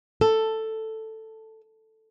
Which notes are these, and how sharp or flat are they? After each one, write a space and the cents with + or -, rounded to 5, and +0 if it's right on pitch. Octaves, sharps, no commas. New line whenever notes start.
A4 +5